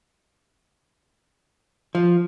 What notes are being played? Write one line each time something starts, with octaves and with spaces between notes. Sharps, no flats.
F3